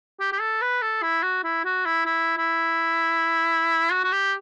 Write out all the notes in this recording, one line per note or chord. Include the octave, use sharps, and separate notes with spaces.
G4
G4
A4
B4
A4
E4
F#4
E4
F#4
E4
E4
E4
F#4
F#4
G4